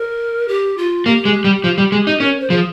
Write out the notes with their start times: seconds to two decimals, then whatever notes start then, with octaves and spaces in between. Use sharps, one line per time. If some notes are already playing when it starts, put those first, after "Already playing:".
Already playing: A#4
0.48 G4
0.78 F4
1.06 A#3 G4
1.25 G#3
1.44 G3
1.64 F3
1.78 G3
1.92 G#3
2.07 D#4
2.20 C#4 A#4
2.40 C5
2.50 F3 G#4